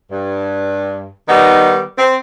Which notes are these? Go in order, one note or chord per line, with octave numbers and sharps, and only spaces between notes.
G2
D#3 G3 B3 D#4
C4